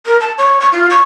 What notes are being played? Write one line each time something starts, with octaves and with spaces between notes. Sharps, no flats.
A#4
A5
C#5
C#6
F4
C#6